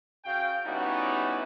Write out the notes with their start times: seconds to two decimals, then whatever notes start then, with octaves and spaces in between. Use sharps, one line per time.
0.25 C#3 F#4 F5 G5
0.66 G3 B3 C#4 D#4 E4 F#4